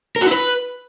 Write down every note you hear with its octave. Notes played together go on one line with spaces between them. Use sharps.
A#4
F#4
E4
B4